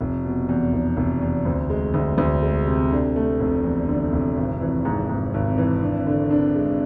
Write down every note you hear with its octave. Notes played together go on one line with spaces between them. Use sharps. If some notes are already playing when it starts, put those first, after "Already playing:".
F1
B2
E2
F1
F1
E2
D2
G#3
D2
D2
G#3
C3
D3
A3
F1
E2
D3
F1
G#1
E3
G#2
G#2
G#1
E3
D4
D3
D4
G#3